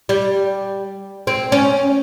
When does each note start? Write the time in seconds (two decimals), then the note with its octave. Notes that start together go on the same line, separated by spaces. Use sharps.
0.09 G3
1.27 C4
1.52 C#4